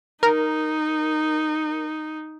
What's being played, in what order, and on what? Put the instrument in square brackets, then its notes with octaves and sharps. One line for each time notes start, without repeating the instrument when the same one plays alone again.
[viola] D#4 [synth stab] A#4